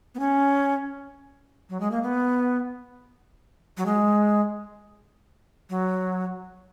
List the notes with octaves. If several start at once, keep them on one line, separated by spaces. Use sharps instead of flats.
B3
C#4
F#3
G#3
A#3
B3
F#3
G#3
F#3